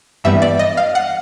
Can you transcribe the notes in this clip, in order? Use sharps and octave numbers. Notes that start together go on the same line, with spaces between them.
G2 E3 G3 B3 E5
D5
D#5
F5
F#5